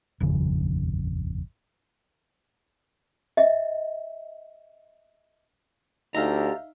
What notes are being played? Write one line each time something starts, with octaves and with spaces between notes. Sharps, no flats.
D#1 G#1 F2 C#3
D#5 E5
D2 D#4 G4 A4 E5 F5 A#5